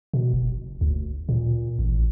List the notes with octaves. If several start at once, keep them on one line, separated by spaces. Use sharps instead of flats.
B2
F#1
D2
A#2
A1